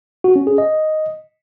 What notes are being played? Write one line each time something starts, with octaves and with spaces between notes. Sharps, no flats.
F#4
C#4
G#4
D#5